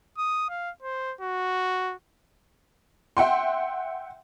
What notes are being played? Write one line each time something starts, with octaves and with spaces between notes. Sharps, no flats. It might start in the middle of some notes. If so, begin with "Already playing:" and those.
D#6
F5
C5
F#4
E5 F#5 G5 C6